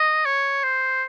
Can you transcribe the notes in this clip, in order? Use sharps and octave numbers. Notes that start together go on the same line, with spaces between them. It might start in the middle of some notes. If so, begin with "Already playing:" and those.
Already playing: D#5
C#5
C5